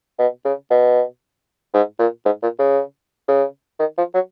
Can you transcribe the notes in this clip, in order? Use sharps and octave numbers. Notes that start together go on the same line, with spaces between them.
B2
C#3
B2
G#2
A#2
G#2
A#2
C#3
C#3
D#3
F3
F#3